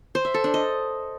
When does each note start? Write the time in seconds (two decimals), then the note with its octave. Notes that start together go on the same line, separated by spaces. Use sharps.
0.15 C5
0.25 E5
0.34 A4
0.44 D4
0.54 D#5